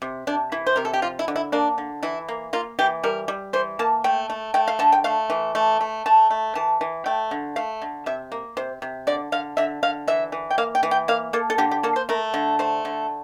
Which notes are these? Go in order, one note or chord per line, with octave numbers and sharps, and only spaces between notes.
C3
C3 D4
E3 E4
C5
C3 A#4
A4
G4
F3 F4
E4
D3
E4
A#3 D4
D3
E3 E4
A#3
A#3 F4
E3 G4
G3 A#4
G3
E3 C5
A#3 A5
A3 G5
A3
A3 G5
F5
D3 A5
G5
A3 F5
E3
A3
A3
A3 A5
A3
E3 A5
E3
A3 G5
D3
A3 F5
D3
C3 E5
A#3
C3 C5
C3
D3 D5
D3 F5
D3 E5
D3 F5
E3 E5
E3
G5
A#3 F5
G5
E3
G5
A#3 F5
A#3 A4
A4
D3 G4
G4
A#3 A4
C5
A3 A#4
D3
A3 C5
D3